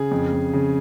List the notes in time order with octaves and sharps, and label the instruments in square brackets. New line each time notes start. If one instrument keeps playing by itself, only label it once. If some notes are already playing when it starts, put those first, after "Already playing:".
Already playing: [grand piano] C#3 G#4
F2
F2
C#3